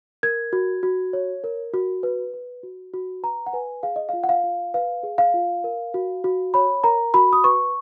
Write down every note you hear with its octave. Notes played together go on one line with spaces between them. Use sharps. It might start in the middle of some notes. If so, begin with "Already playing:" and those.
A#4 G#6
F#4
F#4
C#5
A#4
F#4
B4
B4
F#4
F#4
B4 A#5
F#5
B4 G#5
G#4 F5
D#5
F4 F5
F#5
F5
F4
B4 F5
G#4
F5
F4
A#4
F#4
F#4
C#5 B5
A#4 A#5
F#4 B5
D#6
B4 C#6